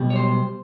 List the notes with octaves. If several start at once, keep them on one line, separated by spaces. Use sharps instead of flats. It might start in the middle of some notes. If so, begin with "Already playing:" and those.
Already playing: B1 B2 G3
C#5
C5